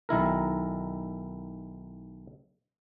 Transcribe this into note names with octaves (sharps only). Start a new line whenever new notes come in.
B1 D#3 E4 A#4